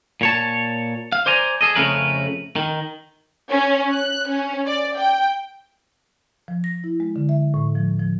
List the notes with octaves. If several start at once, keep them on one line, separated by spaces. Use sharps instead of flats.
A#2 C#5 A5
F5
C5 D5 G#5 A#5
G#4 A4 D#5
F2 C#3 A3 C#4 A#4 B4
D#3
C#4
F#6
C#4
D5
G5
F3
A#6
E4
G#3
D3
E5
A2
F3
F3